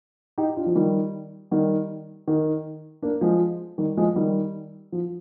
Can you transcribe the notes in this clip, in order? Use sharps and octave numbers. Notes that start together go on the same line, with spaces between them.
D#4 G4
D4 F4
F3
D#3 G3
D#3 G3
D#3
A#3 D4
F3 G#3
D#3 G3
F3 G#3
D#3 G3
F3